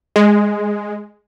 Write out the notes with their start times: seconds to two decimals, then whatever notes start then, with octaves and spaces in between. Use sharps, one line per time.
0.16 G#3